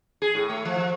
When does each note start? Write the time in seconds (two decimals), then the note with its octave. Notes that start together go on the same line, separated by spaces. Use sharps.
0.22 G#4
0.35 A2
0.49 A3
0.65 F3
0.77 F3